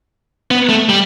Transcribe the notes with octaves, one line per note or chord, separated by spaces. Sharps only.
B3
A3
G3